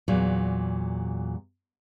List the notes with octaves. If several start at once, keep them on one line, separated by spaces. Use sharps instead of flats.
E2 A#2 F#3